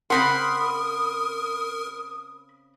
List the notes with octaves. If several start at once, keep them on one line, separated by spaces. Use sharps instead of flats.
C#3 C4 A#4 F#5 B5 C6 D#6